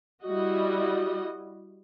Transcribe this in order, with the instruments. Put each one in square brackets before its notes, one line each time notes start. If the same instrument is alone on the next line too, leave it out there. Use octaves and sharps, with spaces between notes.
[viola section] G3 E4 F#4 D#5